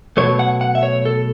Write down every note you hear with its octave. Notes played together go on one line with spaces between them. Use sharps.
B2 F#3 A3 C#5
F#5
F#5
E5
C#5
A4